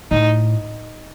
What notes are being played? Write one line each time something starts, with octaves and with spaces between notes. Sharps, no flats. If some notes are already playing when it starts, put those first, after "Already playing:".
A2 D#4